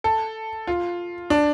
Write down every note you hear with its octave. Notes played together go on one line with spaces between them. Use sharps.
A4
F4
D4